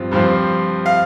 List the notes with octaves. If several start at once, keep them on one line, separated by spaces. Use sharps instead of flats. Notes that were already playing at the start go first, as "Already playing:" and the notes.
Already playing: G2 F3 C4 F4
G2 F3 C4 F4
F5